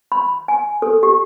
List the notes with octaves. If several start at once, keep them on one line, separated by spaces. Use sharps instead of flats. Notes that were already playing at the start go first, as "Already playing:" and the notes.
B5
G#5
A4
G4